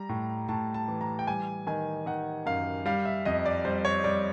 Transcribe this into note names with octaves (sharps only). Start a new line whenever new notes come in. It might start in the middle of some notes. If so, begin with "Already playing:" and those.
Already playing: G3 A#5
A2
A2 A5
A5
E3
A#5
G5
G3 G#5
D#3 G#5
D#3 F#5
F#2 F5
G3 F5
E5
F2 D#5
D5
G3 C5
C#5
G3 D5